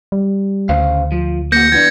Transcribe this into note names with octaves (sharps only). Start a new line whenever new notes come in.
G3
D2 C#3 C5 F5
F3
A#3 F#4 G6 A#6 C#7
E3 B3 D4 G#6